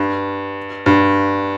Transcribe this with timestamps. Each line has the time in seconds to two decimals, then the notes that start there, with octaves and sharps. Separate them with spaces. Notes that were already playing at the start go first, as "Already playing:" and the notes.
Already playing: G2
0.86 G2